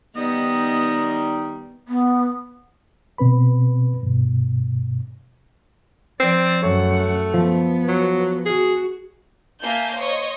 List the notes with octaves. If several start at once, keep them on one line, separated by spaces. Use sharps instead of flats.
D#3 G3 B3 D#4 D#5
B3
B2 C4 B4 B5
G2 B2
F3 C4 D5
F#2 A3 C#5 F#5
F3 B3
F#3
F#4 G#4
A#3 E5 G#5 A5 G6
C5 C#5 D#5 C#6